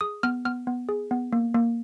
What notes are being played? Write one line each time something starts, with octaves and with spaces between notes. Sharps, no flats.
G#4 D#6
B3 F6
B3 F6
B3
G#4
B3
A#3
A#3